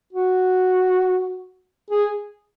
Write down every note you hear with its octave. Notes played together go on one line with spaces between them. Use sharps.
F#4
G#4